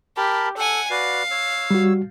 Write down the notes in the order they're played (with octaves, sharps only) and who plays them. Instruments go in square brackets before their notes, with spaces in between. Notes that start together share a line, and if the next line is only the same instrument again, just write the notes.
[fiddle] G4 [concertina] A#4 A5 B5
[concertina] A4 [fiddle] F#5 G#5
[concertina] F#4 B4 D5 [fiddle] F5
[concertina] C#5 E6
[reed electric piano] G3 F#4